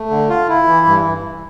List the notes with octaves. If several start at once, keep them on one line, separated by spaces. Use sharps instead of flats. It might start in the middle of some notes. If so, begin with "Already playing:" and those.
Already playing: A3
D3
F4
E4
E3
G2